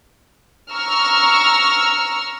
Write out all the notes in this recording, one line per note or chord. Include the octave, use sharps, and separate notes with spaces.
A#5 C#6 E6 F6